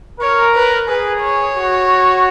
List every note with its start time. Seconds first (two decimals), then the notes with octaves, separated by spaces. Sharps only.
0.20 A#4 C#5
0.55 B4
0.88 G#4 B4
1.21 C#5
1.56 F#4